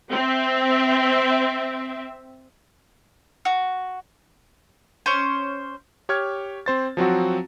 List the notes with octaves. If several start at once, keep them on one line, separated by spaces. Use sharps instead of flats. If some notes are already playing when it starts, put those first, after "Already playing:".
C4 E5
F#4
C#4 C5
G4 C#5 C#6 F6 G#6
C4 C5 A6
F3 F#3 C4 F#4